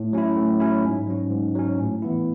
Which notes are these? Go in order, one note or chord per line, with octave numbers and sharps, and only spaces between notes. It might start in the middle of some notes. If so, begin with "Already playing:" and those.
Already playing: A2
F#3 C#4 E4
A2
F#3 C#4 E4
G#2
F#3 C#4
G#2
F#3 C#4
A2
E3 B3 E4